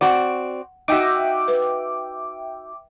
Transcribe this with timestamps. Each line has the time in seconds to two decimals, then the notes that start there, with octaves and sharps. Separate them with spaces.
0.01 C4 F#4 D5 F#5
0.88 D#4 F#4 D#5 E5 G5 D6
1.48 B4